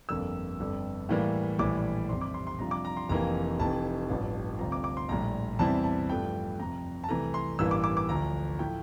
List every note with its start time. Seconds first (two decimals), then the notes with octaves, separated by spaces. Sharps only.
0.09 G1 F2 D3 G3 A#3 E6
0.59 G1 F2 D3 G3
1.09 A2 E3 G3 A#3
1.59 A#1 A2 E3 G3 D6
2.09 F1 F2 C3 G3 C4 C6
2.21 D6
2.34 C6
2.47 C6
2.59 F2 C3 G3 D4 F4 A#5
2.71 D6
2.85 A#5
2.97 C6
3.09 F1 F2 E3 A#3 A#5
3.59 F1 F2 E3 A5
4.09 A1 G2 F3
4.59 D2 C3 G3 C4 F4 A#5
4.72 D6
4.84 D6
4.97 C6
5.09 A#1 A2 G3 A#5
5.59 E2 C3 G3 C4 E4 A5
5.84 A5
6.09 G2 F3 A3 G5
6.59 F2 C3 F3 A#5
7.04 A5
7.09 C2 C3 E3 A3 A#5
7.34 C6
7.59 A1 G2 E3 A#3 E4 E6
7.71 D6
7.84 D6
7.97 D6
8.09 D2 D3 F3 A#5
8.59 A2 F3 A3 E4 G5